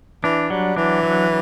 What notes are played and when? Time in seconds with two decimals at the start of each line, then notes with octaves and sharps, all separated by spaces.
0.24 E3 D4
0.50 F#3 G3
0.76 E3 D4
1.03 F#3